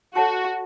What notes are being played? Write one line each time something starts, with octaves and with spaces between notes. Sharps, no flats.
F#4 A4 C#5 F#5 A5 C#6